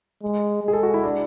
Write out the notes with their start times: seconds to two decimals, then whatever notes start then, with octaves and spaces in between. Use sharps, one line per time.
0.22 G#3
0.62 G#3
0.68 G#4
0.73 A4
0.83 F#4
0.94 E4
1.03 D4